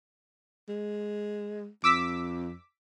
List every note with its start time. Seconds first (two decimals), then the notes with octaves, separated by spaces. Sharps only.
0.69 G#3
1.84 F2 D6 E6 B6